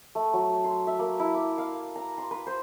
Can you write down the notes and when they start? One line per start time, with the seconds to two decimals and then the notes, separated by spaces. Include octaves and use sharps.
0.15 A3
0.33 F#3
0.64 C6
0.87 E5
0.99 A#3
1.20 E4
1.34 D6
1.58 F5
1.96 A#5
2.18 C6
2.31 B4
2.47 C5